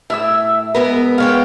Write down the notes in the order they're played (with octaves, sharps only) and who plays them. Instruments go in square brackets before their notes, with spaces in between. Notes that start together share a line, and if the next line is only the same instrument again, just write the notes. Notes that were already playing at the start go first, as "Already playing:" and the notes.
[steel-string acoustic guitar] A2 [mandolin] E4 E5 E6
[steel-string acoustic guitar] G#2 B3 A#4 [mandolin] B4
[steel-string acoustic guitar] G#3 B3 G5 [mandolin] C#5 F5